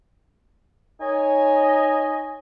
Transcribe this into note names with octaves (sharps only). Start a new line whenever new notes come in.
D#4 C#5 D#5 G#5